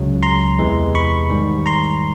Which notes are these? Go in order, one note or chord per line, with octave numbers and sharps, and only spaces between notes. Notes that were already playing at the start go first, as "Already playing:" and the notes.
Already playing: C#2 C#3 F#3
A#5 C6
E2 C3 E3 G#3
B5 C#6
G#2 D#3 G3
A#5 C6